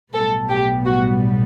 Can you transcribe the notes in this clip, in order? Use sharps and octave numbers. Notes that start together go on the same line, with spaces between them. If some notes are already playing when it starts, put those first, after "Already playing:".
B1 A2 G3 B3 A4
G4
F#4